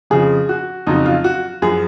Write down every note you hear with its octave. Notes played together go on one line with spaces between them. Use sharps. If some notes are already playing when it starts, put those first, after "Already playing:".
F2 C#3 F3 G#4
F#4
F2 C#3 F#3 D#4
F4
F#4
F#2 F3 G#4